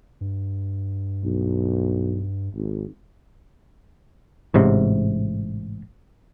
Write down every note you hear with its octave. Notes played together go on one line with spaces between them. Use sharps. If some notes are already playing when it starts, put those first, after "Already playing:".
G2
B1
G#1
A1 G#2 C3